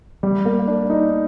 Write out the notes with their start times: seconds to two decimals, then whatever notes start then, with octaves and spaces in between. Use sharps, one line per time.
0.23 G3
0.45 A#3
0.68 D4
0.90 D#4